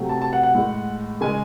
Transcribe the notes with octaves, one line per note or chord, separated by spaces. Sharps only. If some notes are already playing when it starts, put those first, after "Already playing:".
Already playing: C3 F#3 A3
A5
A5
F#5
F#5
A2 G#3
C#3 G#3 G#5